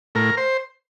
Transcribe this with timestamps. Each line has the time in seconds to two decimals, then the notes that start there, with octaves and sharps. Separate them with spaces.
0.15 A2 A#4
0.37 C5